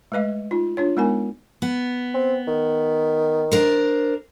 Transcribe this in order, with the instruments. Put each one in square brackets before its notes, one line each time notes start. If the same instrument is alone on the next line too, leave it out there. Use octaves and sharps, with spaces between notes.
[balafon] G#3 A3 B4 D#5 F5
D#4 F4
D4 F4 C#5
G#3 B3 D#4 A#4 G#5
[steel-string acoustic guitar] B3
[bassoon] C4
D#3
[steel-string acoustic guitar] D4 A#4 C5